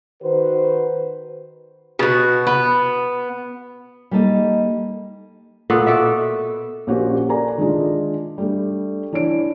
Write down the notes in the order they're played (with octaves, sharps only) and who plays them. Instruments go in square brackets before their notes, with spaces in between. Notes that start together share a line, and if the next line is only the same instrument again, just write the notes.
[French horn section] D#3 F#4 B4 C5
[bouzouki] B2 F#4
B3
[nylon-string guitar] G3 A#3 D#4 A4 D#5
[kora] A#2 B3 F#4 A4
B2 A4 D5 E5
[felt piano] A#1 C#4 F#4 G4 A#4 C5
A4 A#4 D5 G#5 A#5
D#3 G#3 D4 D#4 F4
G3 A3 D4
E3 D4 C#5 D7